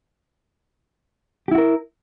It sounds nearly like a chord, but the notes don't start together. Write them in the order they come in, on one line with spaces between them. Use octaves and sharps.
G4 E4 F#4 A#4